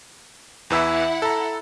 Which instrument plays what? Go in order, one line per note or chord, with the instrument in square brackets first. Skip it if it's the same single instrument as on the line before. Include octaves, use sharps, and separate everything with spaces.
[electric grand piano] E2 E3 E6 [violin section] E4 F#5
[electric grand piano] A4 A#5